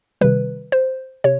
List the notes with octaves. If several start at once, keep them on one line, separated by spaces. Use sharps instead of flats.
C3 D#3 G3 B4
C5
C3 C#5